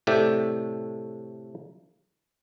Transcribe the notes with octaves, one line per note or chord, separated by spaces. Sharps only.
A2 C3 A3 D5 E5 G5